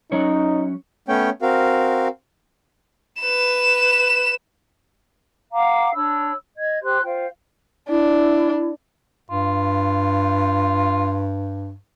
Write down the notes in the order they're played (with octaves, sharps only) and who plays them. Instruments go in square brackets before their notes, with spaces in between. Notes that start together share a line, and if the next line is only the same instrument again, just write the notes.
[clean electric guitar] F#3 C#4 C#5 [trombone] D#4
[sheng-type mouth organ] A3 B3 C#4 C#5 G5
C4 F#4 A#4 F5
[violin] B4 E7
[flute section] F5 F#5 A#5 D6
D4 C#5 B5 E6
D#5 G#6
G4 C5 C6 F#6
F4 C5 F5 G5
[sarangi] D4 [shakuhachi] E4
[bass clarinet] G2 [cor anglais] F4